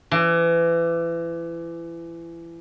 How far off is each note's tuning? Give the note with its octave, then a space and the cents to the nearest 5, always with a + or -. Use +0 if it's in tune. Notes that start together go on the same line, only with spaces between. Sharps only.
E3 +30